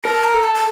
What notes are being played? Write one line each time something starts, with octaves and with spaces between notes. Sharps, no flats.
A#4 A5
A#5
A4
A5
A5